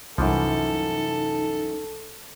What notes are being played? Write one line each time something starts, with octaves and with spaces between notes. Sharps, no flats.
C2 F#2 E3 F3 D#4 A4